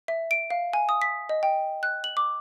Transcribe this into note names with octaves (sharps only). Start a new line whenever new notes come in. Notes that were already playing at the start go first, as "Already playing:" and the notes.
E5
D7
F5
G#5
D#6
B6
D#5
G5
F#6
F#7
D6